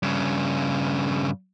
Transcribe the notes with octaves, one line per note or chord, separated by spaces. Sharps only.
G2 C#3